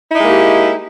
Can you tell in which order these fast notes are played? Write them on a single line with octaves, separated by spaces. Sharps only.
E4 D#4 G#3 A#3 G4